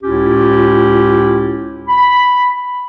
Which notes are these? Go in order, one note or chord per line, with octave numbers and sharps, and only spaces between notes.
C#2 A2 C#4 E4 F4 G4
B5